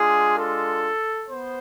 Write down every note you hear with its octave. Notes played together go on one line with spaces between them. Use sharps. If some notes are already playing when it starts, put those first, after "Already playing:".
Already playing: G#3 D4 F4 G#4
A4
B3 C5